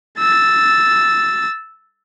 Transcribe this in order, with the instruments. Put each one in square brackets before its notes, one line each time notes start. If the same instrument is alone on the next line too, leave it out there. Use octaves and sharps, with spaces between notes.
[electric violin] E6 A6